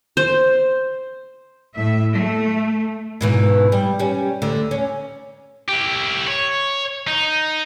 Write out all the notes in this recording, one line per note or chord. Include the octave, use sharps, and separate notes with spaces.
C5
A2 E5
A3
G#2 B2 E3
G3
G3 C#4
D2 D3
C#4
E4 G4
C#5
D#4